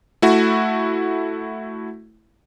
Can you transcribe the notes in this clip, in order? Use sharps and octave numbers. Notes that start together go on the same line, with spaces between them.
A3 E4 F#4